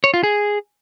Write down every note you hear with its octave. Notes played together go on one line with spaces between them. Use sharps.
C#5
F4
G#4